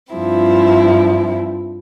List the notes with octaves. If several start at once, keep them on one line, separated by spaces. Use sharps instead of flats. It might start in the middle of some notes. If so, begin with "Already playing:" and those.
G2 F3 C4 E4